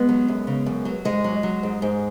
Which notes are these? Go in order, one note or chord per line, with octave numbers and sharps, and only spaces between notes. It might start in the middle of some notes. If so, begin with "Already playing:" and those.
Already playing: G#3 B3
F#3
F#2
C#3
F#2
F#3
G#2 G#3
F#3
F#3
G#2
G#2